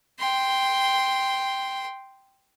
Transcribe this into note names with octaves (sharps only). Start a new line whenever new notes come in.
G5 C6